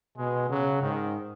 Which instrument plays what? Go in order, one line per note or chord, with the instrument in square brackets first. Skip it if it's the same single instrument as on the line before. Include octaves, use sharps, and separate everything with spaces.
[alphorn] B2 [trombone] G#3
[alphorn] C#3 [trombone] F#3
[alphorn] G#2 [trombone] D#3